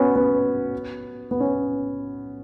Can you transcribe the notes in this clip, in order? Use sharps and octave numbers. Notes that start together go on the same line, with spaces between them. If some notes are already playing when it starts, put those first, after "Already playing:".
Already playing: B3 C#4 F#4
B3
B3
C#4